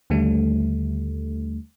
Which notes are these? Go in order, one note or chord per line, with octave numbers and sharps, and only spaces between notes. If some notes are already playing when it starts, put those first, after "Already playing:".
D#2 D3 G3 A3